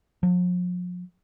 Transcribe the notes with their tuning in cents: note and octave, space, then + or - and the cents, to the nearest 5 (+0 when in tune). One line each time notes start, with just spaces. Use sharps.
F3 +40